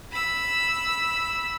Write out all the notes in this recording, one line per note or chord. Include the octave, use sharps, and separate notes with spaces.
B5 E6